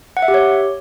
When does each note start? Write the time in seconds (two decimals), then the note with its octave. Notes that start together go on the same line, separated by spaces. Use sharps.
0.17 F#5
0.22 E5
0.28 G4
0.34 C#5